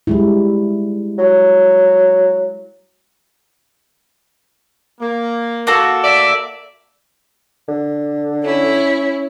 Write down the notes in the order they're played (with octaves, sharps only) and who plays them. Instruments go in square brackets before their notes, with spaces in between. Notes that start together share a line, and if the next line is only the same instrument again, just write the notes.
[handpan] G3 G#3 E4
[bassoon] F#3
[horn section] A#3
[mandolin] A#3 F#4 A4
[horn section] D5 E5
[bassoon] D3
[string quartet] C#4 E4